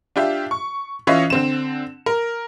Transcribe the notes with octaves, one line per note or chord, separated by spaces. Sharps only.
D4 F4 G4 E5
C#6
E3 C#4 F4 C#5 D#5 E5
D3 C4 E7
A#4